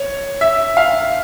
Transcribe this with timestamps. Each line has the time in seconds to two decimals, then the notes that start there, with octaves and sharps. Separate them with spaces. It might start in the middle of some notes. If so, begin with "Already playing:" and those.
Already playing: C#5
0.41 E5
0.77 F5